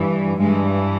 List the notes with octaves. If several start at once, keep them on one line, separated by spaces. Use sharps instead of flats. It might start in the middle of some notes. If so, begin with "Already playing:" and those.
Already playing: G2 E3
G2 E3 G#3